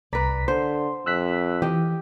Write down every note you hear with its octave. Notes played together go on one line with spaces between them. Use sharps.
C2 B4 D5 A#5 B6
D3 C5 C6
F2 E6 F#6 B6
E3 G4 D#5